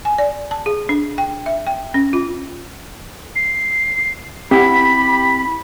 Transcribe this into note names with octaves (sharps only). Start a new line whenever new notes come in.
G#5
D5
A5
G#4
D4
G5
E5
G5
C#4
F4
C7
C4 E4 G4 F#5 B5 B6